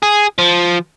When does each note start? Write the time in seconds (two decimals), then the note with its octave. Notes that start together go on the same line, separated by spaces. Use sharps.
0.03 G#4
0.38 F3